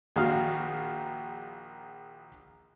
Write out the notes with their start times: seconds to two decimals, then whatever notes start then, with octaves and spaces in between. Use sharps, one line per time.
0.16 A#1 D#3 F#4 F5 D#6 F6